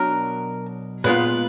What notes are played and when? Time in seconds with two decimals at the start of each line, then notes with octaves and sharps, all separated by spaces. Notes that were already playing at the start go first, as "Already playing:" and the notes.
Already playing: B2 F#3 D4 A#4
1.04 A#2 G#3 B3 F4 B4